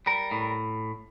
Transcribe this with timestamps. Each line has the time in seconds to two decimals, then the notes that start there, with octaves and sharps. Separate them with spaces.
0.06 G3 A#4
0.31 A2